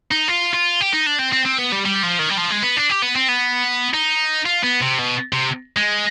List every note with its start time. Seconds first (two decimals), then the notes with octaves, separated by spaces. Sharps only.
0.11 D#4
0.28 F4
0.54 F4
0.81 G4
0.93 D#4
1.06 D4
1.19 C4
1.33 C4
1.45 C4
1.58 B3
1.72 G3
1.85 G3
2.03 F3
2.19 D#3
2.30 G3
2.38 F3
2.50 G#3
2.63 B3
2.77 D4
2.90 G4
3.02 B3
3.16 C4
3.29 B3
3.94 D#4
4.46 F4
4.64 B3
4.82 C3
4.99 B2
5.33 C3
5.77 G#3